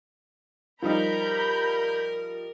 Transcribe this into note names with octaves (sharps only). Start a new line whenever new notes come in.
F3 G3 D#4 A#4 A#5 B5 G6